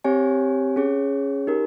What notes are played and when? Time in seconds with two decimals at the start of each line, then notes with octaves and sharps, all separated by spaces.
0.04 C4 G4 C#5 G#5
0.76 C#4 G#4 C#5
1.47 D#4 G4 A#4